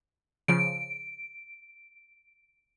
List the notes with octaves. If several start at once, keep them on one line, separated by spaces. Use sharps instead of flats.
C#3 F3 D7